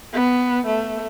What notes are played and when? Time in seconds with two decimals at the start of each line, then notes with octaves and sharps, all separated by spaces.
0.13 B3
0.67 A3